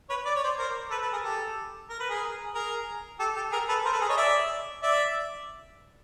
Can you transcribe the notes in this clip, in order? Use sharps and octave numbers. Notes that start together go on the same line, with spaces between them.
B4 C#5
D5
C#5
C5 D5
A#4 C5
A4 B4
A4 B4
G#4 A#4
G4 A4
A#4
B4
G#4 A#4
G#4 A#4
G4 A4
G4 A4
G#4 A#4
A4 B4
A#4 C5
A4 B4
G#4 A#4
C#5 D#5
D5 E5
D5 E5